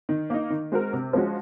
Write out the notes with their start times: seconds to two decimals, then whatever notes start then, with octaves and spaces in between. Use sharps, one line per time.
0.09 D#3
0.30 A#3 D#4
0.50 D#3
0.72 G#3 C4 F#4 A#4
0.93 C3
1.13 F3 G#3 C#4 F#4